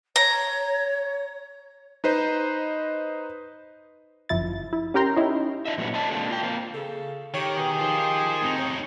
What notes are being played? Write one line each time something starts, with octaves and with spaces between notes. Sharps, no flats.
C#5 A#5
D#4 B4 C5 D#5
G1 F#2 F3 E4 A6
E4
C#4 G4 A#4 G5 A#5 C6
C#4 D#4 E4
D4 D#5 E5
A#2 F#3 A3 C#4 F#4 B4
B4 D5 D#5 A5
G#3 A#3 C4 D4 F#4 A4
F4 G5
A#3 C4 F4
C#3 A4
D#3 G4 C#5
B2 G#4
D#3 F4 C5
A2 C4 D#4
C#5